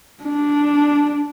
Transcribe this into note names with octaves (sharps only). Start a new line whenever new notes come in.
D4